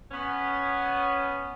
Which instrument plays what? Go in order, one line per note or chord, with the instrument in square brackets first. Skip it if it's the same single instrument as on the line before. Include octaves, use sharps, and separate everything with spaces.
[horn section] B3 C#4